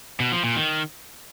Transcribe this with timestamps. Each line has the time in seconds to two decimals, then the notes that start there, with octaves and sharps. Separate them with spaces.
0.20 B2
0.32 F3
0.44 A#2
0.56 D#3